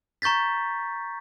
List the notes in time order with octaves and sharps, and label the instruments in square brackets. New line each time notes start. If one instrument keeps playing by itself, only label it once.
[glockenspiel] A#5 C#6 G6 A6 B6